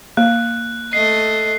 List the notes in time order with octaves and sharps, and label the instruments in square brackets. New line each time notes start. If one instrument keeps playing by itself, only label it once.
[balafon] A#3 [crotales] F#6
[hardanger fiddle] A3 D#5 [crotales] C7